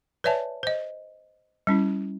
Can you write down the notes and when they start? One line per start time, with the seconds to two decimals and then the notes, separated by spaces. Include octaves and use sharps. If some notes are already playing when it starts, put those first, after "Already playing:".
0.24 B4 C#5 D5 E5 G#5 A5
0.63 C5 D#5
1.67 G3 C#4 E4